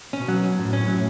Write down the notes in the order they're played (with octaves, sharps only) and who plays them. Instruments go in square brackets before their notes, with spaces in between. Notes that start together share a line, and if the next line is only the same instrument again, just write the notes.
[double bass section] B2 [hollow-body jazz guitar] C#4
[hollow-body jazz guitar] F#3
C#4
[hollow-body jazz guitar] F#2 [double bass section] A2
[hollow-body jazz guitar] C#4
F#3